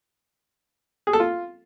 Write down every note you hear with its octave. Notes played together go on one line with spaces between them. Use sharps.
G#4
A4
F4